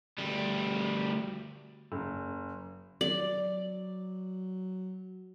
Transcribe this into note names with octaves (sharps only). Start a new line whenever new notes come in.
D2 G3
F#1
F#3 D5